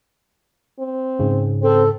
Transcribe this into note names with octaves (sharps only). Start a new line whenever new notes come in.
C4
G#2 C#3
C4 A4